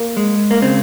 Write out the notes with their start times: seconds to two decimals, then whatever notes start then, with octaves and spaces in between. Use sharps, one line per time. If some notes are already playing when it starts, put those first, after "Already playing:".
Already playing: A#3
0.17 G#3
0.51 A#3
0.62 C#3 C4